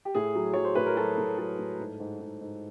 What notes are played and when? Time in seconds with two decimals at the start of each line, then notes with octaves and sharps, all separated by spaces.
0.05 G4
0.15 A2 G#4
0.35 F#3
0.54 F#3 C#5
0.65 C5
0.75 A2 B4
0.86 A#4
0.97 F#3 A4
1.18 A2
1.38 F#3 A4
1.59 A2
1.80 G#2
2.00 G#2
2.21 G#2
2.41 G#2